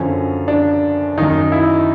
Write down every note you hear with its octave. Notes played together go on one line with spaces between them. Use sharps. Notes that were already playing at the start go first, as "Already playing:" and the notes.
Already playing: F#2 D3 F3 C#4
D4
F#2 D#3 D#4
E4